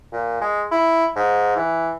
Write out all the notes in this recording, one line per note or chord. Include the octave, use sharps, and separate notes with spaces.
A#2
G#3
E4
G#2
E3